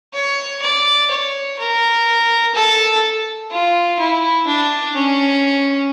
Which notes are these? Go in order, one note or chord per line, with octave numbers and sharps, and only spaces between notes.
C#5
D5
C#5
A#4
A4
F4
E4
D4
C#4